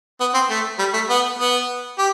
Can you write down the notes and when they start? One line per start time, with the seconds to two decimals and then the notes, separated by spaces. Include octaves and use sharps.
0.20 B3
0.34 C4
0.50 A3
0.79 G3
0.94 A3
1.09 B3
1.39 B3
1.98 G4